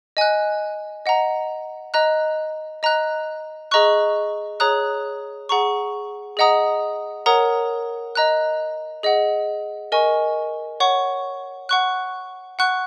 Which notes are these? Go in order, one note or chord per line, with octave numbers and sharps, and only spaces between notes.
D#5 G#5 F#6
D#5 F#5 A#5
D#5 A#5 F#6
D#5 A#5 F#6
G#4 D#5 A#5 C#6 F#6
G#4 C#5 A#5 D#6 F#6
G#4 F#5 A#5 C#6
G#4 D#5 F#5 A#5 D#6
A#4 C#5 F#5 A#5 D#6
D#5 A#5 F#6
G#4 D#5 F#5
A#4 D#5 G#5 C#6
C#5 F#5 C#6
F#5 C#6 F#6
F#5 C#6 F#6